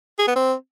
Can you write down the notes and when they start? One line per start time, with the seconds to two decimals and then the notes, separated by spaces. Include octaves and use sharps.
0.19 G#4
0.27 B3
0.36 C4